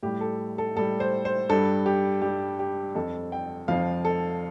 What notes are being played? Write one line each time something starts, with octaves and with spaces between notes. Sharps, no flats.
A2 G3 G4
A4
A4
A2 G3 A4
C5
C5
G2 G3 A4
G4
G2 G3 G4
G4
F2 F3 A4
G5
F2 F3 F5
A4